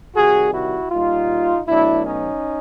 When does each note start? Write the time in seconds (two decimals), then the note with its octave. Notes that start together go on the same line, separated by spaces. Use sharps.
0.15 C3 D#3 G3 F#4 G#4
0.54 E4 F#4
0.91 A#2 G3 D#4 F4
1.67 B2 F#3 A3 D4 E4
2.06 C#4 D#4